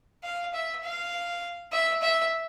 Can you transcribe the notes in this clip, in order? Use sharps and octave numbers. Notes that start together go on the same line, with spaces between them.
F5
E5
F5
E5
E5